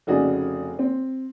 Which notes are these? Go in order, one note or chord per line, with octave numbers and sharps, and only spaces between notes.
F1 C#3 D#4 F#4 G#4 D5
C4